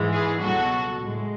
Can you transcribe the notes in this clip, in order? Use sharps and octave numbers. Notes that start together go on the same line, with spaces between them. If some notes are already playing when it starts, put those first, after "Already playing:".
Already playing: G#2 E3 G#3
G#4 B4
C#2 B2 F#3 F#4 A4
A2 G#3